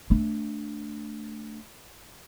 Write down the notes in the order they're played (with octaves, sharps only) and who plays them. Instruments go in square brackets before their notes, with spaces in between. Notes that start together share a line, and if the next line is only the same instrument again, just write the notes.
[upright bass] A3 D4